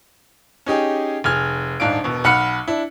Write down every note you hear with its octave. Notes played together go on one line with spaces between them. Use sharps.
C#4 D#4 G4 G#4
F1 G#4 F6 G#6
D#1 G#2 D4 F5 D7
E1 B2
B1 F#5 B5 F6 C#7
D4 E4